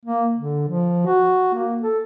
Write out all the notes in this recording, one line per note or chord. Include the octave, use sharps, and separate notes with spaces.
A#3
D3
F3
F#4
A#3
A4